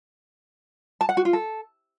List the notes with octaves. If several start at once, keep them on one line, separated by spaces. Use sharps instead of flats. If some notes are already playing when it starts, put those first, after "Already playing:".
A5
F#5
F#4
F4
A4